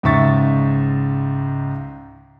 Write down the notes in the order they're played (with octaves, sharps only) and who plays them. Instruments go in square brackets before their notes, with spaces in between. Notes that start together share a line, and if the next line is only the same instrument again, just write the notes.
[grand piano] C#2 G#2 C#3 E5 C#6 A6